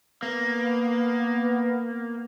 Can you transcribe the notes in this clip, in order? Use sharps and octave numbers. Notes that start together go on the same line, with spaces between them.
A#3 B3